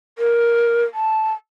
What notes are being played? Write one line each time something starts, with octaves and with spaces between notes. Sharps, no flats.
A#4
A5